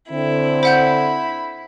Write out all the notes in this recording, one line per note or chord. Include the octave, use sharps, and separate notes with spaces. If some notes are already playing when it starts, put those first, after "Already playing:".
D3 C4 E4
C5 F#5 B5 G6